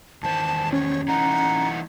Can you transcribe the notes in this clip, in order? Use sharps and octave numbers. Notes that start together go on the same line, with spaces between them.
E2 D#3 C5 A5
C#4 C#5
E3 A3 D#4 F#5 A#5